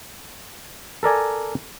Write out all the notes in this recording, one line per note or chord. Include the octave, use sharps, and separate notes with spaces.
A4 A#4 D5 G#5